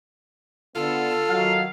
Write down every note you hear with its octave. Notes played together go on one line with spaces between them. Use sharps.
D3 B3 F4 A4
D#3 F#3 F5